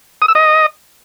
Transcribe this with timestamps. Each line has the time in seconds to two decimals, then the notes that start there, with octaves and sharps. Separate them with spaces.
0.22 D#6
0.28 E6
0.35 D#5